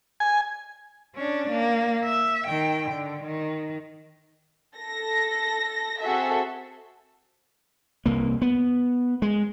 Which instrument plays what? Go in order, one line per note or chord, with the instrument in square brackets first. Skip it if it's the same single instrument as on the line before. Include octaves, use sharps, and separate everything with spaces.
[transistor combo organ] G#5
[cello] C#4 D4
A#3
E5
D#3 G5
D3
D#3
[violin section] A4 A#6
C4 F#4 G#4 A4 E5
[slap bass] C2 A#3
B3
G#3